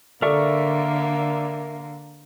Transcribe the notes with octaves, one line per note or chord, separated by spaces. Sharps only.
D3 A#3 A4 A#4 D5 E5 C#6